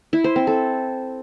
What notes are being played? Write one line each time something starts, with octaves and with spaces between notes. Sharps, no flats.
E4
C5
C4
A4